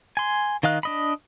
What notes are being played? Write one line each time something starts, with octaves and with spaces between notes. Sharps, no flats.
G#5 C6
D#3 D#5 F5 F#6
D4 D#5 B5